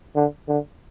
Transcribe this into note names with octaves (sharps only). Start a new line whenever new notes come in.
D3
D3